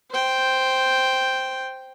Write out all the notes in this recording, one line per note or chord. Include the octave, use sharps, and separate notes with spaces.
C5 G5